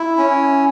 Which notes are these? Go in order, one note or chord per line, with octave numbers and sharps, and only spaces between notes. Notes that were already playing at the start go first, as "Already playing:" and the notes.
Already playing: E4
C#4